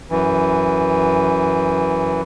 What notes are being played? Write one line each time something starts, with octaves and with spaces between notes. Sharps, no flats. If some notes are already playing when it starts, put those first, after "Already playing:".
F#2 E3